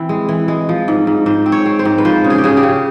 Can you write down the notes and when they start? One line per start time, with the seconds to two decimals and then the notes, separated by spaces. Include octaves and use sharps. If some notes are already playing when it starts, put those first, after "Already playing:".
Already playing: E3 C4
0.09 G#3
0.29 E3
0.48 G#3
0.69 F3
0.88 G#2
1.07 G#2
1.26 G#2 C5
1.46 C4
1.52 C#5
1.66 C4
1.79 C5
1.85 G#2
1.98 B4
2.05 F3 C5
2.24 C#3
2.30 G#4
2.38 G4
2.44 C#3 G#4
2.57 G4
2.63 C#3